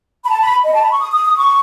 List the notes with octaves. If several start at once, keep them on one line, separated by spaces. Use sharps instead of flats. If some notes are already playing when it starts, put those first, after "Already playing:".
B5
A5
B5
D#5
A5
B5
C#6
D#6
D#6
D#6
C#6